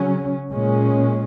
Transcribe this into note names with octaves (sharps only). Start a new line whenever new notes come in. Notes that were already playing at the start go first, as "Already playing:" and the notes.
Already playing: C#3 F#3 C#4
A#2 G#3 C#4